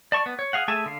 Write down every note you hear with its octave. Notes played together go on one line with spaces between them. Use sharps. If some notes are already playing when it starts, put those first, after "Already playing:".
D5 A5 C#6
B3
C#5
G#4 F5 F#5
A3 G#4 E5 G#5 A5
D3 F5